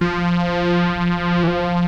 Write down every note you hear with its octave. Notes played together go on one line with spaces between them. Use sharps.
F3
E3
F3